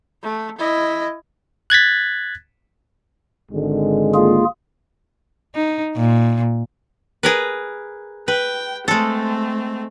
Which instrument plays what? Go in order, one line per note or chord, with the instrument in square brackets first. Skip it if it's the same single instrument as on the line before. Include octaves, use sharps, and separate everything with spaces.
[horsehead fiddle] A3
E4 D#5
[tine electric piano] F#6 G#6 A6 B6
[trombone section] G#1 D3 G#3
[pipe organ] A#3 F4 G#4
[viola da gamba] D#4
A#2
[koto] G#4 A#4 B4
[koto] B4 [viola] G5
[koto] G#3 A4 [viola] A3 C4